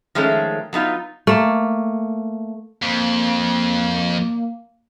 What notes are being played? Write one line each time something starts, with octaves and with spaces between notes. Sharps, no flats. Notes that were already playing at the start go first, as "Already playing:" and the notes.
D#3 F3 G#3 A3 C#4
F#3 B3 D#4 F4
A3 A#3
F2 A#3